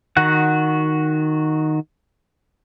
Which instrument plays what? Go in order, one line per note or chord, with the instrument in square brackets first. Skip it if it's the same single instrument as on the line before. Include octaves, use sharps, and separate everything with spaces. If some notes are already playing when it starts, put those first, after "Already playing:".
[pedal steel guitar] D#3 F#4 F#5